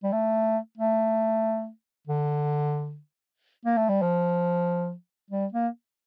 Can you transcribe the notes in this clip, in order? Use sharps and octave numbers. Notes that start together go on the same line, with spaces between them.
G3
A3
A3
D3
A#3
A3
G3
F3
G3
A#3